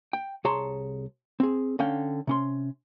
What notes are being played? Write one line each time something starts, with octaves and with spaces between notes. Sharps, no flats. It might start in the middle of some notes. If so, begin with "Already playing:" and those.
G5
C2 G#4 C#5 A5 A#5 C6
C4 G#4
D3 C#4 F5 G5
C3 C#4 C6